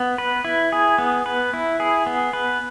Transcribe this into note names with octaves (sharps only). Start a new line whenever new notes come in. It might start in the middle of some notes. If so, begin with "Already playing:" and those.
Already playing: B3
B4
E4
G#4
B3
B4
E4
G#4
B3
B4